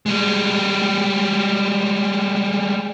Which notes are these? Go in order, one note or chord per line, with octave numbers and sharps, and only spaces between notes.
G3 G#3